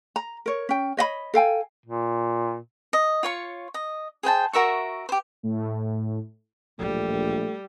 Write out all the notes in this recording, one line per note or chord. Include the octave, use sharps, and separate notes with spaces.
A#5
A#4 C#5
C#4 G5
C#5 D#5 F5 B5
A4 F5 G5 G#5
A#2
D#5
F4 C#5 C#6
D#5
G#4 C5 G5 A5
F#4 A#4 E5 C#6
G4 C5
A2
D1 A#1 G3 A3 F4